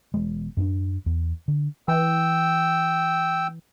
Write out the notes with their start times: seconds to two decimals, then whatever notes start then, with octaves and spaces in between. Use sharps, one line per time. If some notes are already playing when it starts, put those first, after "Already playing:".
0.14 E1 E2 G#3
0.57 F#2 B3 D4
1.06 E2
1.48 D3
1.88 E3 G5 E6